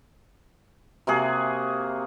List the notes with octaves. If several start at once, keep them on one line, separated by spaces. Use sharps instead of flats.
C3 A#3 F#4 G#4